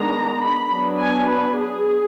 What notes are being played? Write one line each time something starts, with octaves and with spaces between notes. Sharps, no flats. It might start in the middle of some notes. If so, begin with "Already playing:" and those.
Already playing: D#3 G#3 B3 D4 A#5
B5
F#3 B3 D4
G#5
B4
G#4